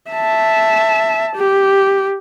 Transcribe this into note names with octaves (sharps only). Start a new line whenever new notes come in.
E5 A5
G4